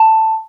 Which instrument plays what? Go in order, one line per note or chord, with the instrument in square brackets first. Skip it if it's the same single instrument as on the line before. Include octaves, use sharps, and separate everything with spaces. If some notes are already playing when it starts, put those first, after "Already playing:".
Already playing: [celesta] A5